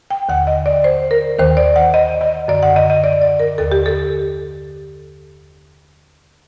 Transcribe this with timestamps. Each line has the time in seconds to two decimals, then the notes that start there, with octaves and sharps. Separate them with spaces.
0.11 G5
0.29 D#2 D3 F#5
0.47 D#5
0.66 D5
0.84 C5
1.11 A#4
1.39 D#2 D#3 C5
1.57 D5
1.76 F#5
1.94 D#5
2.21 D#5
2.48 F#2 D3 D5
2.63 F#5
2.76 D#5
2.90 D#5
3.04 D5
3.22 D5
3.40 A#4
3.58 D#2 D3 A4
3.72 G4
3.86 A4